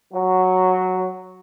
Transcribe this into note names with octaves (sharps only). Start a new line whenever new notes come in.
F#3